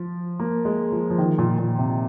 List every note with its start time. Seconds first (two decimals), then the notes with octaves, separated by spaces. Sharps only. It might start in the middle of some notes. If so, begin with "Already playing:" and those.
Already playing: F3
0.39 A#3
0.65 G#3
0.92 F3
1.10 F3
1.18 D#3
1.38 A#2
1.58 A#2
1.78 C3